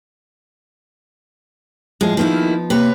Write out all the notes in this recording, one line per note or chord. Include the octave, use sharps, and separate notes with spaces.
A2 F3 G#3
D#3 F3 A#3 B3 D#4 E4
C3 A#3 B4 C#5